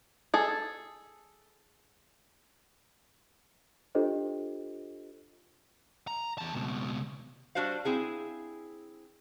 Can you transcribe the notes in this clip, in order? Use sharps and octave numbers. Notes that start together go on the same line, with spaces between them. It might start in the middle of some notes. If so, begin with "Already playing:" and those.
G#4 A4
D4 F4 G4 A4 C5 D#5
A#5
E2 A5
C#2 B2
G3 D4 F#4 C5 F5
C4 E4 G#4 F5